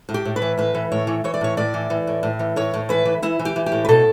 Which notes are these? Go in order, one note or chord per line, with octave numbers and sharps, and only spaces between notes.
A2
G4
A2
B4
E3
A2 B4
E3
A2 C#5
E3
E3 C#5
D5
A2 C#5
A2 D5
E3
E3
A2
A2
E3
A2 C#5
A2
E3 B4
E3
E3 E4
E3
G4
E3
G4
A2
B4
B2 A4